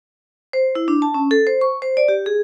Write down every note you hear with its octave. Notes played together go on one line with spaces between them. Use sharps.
C5
E4
D4
A5
C#4
A4
C5
C#6
C5
D5
G4
G#4